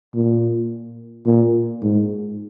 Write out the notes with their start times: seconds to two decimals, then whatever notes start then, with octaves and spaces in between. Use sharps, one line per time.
0.14 A#2
1.26 A#2
1.82 G#2